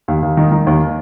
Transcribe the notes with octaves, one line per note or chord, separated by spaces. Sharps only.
D#2
D#2
D#3
D#3
D#2